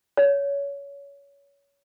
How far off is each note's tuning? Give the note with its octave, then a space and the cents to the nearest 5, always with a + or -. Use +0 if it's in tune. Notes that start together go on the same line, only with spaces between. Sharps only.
C#5 +25